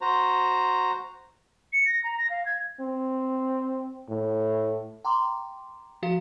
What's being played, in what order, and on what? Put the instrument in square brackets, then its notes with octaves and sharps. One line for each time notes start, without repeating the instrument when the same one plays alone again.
[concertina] F#4 C5 A#5
[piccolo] C#7
A#6
A#5
A#6
F5
G#6
[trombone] C4
A2
[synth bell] G5 A#5 C6 D6
F3 F#4 F5